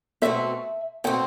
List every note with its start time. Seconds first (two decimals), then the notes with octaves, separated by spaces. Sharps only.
0.22 B2 A3 C4 F#4 E5
1.04 B2 A3 C4 F#4 G5